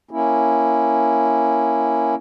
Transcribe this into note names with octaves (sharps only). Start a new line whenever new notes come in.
A#3 C#4 E4